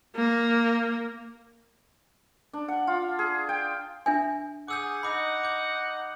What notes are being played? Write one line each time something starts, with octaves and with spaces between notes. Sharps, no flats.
A#3
D4
F#5
F4
G#4
G5
D4 E5 G#5
G#4 F#5 D6 E6 G6
D#4 F#5 B5 D6 E6
D6 G6